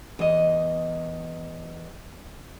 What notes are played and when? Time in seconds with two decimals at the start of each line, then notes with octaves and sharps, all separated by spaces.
0.19 E2 D#5